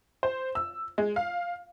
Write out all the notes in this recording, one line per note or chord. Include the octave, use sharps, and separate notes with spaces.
C5
E6
G#3
F5